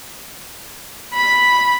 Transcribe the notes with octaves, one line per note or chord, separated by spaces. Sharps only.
B5